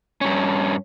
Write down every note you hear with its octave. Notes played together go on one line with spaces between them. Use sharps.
G2 C#4